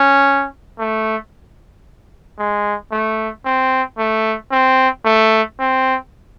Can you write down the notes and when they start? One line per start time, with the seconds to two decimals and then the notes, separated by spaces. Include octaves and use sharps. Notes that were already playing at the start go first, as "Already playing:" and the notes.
Already playing: C#4
0.79 A3
2.39 G#3
2.92 A3
3.45 C4
3.98 A3
4.52 C4
5.05 A3
5.59 C4